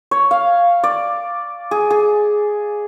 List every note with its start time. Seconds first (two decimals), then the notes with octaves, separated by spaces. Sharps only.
0.11 C#5
0.31 F5
0.84 D5
1.71 G#4
1.91 G#4